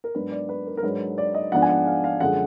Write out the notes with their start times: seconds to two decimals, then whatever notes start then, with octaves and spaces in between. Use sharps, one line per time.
0.04 A#4
0.15 G#2 F#3 B3 D4 B4
0.32 D5
0.49 B4
0.67 A#4
0.77 A#4
0.83 G#2 F#3 D4 B4
1.18 D5
1.34 D#5
1.52 G#2 F3 B3 D4 F#5
1.62 G#5
1.69 F#5
1.86 F5
2.04 F5
2.20 F#2 D3 F3 G#3 F#5